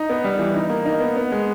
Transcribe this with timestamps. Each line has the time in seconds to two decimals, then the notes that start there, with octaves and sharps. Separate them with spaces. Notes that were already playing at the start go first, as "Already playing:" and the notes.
Already playing: D#4
0.10 B3
0.24 G3
0.39 E3
0.55 D#4
0.70 A#3
0.85 D#4
1.00 B3
1.16 B3
1.32 G#3